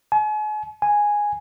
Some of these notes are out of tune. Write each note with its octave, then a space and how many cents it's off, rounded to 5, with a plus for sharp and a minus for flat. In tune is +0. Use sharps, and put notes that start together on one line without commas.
G#5 +40
G#5 -5